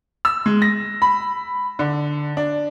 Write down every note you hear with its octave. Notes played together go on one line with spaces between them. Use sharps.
E6
G#3
A#6
B5
D3
D4